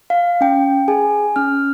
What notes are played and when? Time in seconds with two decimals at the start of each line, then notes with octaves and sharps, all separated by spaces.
0.10 F5
0.41 C#4 G5
0.88 G#4 G#5
1.36 C#4 F6